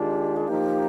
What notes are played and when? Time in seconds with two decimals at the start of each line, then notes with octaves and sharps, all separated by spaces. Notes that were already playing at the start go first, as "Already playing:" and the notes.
Already playing: D#3 G#3 D4 F4 G4
0.37 G#4
0.48 F3 A#3 D#4 G4